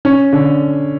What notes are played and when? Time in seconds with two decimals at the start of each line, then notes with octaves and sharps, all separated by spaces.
0.05 C#4
0.33 D3